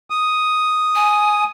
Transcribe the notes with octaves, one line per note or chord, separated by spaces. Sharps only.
D#6
G#5